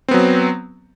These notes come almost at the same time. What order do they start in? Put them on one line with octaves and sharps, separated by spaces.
C4 B3 F#3